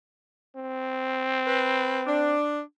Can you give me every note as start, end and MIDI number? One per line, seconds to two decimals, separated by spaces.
0.57 2.34 60
1.47 1.99 71
2.06 2.59 62